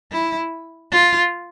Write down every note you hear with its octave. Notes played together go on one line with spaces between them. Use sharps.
E4
F4